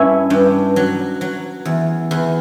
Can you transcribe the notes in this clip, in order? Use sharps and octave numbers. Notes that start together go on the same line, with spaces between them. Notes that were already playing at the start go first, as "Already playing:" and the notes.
Already playing: G2 C#4 E4
G2
F#3
F#3
E2
E2